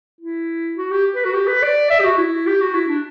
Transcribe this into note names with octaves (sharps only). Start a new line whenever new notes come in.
E4
F#4
G4
B4
F#4
G4
B4
D5
E5
G4
F#4
E4
G4
F#4
E4
D4